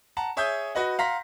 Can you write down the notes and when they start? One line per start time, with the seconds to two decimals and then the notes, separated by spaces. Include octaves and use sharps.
0.17 F#5 A5 A#5
0.37 G#4 C#5 E5 G#5 D#6 G6
0.75 F#4 B4 D#5 F#5
0.99 F5 F#5 A#5 C6 A#6 B6